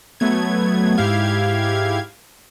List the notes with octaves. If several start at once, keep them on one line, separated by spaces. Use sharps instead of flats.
F#3 A3 B3 G#6
G#2 E4 G4 F5 G#6